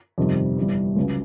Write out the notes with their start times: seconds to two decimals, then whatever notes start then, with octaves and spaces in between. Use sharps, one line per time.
0.18 G1 F2 C3 D#3 G3
0.57 G1 G2 E3 G3
0.96 C#2 C#3 F#3